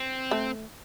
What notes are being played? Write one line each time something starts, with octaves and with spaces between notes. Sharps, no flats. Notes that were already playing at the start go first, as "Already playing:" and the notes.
Already playing: C4
A3